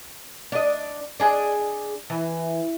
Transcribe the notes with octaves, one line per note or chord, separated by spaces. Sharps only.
D4 D#5
D4 G#4 D#5
E3